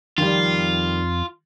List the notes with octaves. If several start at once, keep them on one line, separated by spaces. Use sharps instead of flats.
F2 D#3 G3 F4